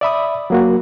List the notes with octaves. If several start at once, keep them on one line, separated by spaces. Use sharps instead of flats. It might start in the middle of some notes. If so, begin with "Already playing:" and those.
D5 E5 B5 D#6
F#3 A#3 F#4